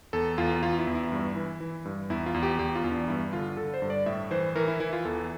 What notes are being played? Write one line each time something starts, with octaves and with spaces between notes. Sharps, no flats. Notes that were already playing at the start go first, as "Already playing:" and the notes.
E2 A4
E2 F4
E2 F4
E4
E2
E4
G2
E3
E3
G2
E2 E4
F4
E2
G4
E2 G4
F4
E2
D4
G2 E4
D3 F4
D3 A4
C5
G2
D5
A2 E5
E3 C5
E3 A#4
E4
E3 E4
F4
E2 A4